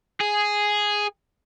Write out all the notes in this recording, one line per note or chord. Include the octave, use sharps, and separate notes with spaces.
G#4